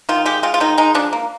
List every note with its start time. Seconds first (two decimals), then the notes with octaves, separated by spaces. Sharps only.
0.09 D#3 F4
0.26 G#3 G4
0.43 G#3 F4
0.54 F4
0.60 D#3 D#4
0.78 G#3 D#4
0.95 F3 D4
1.13 A#3